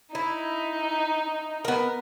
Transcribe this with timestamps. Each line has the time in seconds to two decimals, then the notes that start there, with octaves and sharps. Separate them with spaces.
0.15 D#4 E4
1.65 B3 A#4